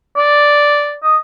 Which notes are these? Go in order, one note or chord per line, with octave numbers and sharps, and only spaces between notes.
D5
D#5